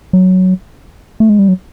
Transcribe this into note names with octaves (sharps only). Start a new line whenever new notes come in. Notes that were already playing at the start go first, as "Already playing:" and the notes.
F#3
A3
G#3
G3
F#3